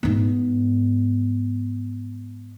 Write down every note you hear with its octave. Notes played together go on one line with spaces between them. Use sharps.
G#2 B3